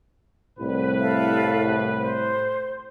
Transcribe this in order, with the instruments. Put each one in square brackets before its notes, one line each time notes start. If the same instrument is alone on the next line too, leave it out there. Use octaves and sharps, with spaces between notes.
[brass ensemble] C2 B4 [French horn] A2
[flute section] A4 E5 F5
C5